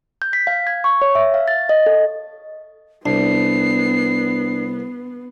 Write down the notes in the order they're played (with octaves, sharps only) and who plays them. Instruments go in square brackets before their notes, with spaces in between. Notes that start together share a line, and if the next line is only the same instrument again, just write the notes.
[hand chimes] G6
B6
F5
G#6
C#6
C#5
E5
F5
A6
D#5
A4
[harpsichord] C2 [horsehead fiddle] B3 [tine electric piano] D4 [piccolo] C7